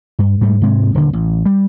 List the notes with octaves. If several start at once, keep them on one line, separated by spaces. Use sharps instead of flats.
G2
G#2 G3 A3
G#2 C3 G#3
D#1 D3
A1
G3